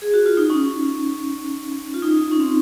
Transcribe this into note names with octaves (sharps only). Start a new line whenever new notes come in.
G#4
F#4
F4
D#4
C#4
F4
D#4
C#4
C4